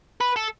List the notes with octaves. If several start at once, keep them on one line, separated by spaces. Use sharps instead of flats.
B4
A4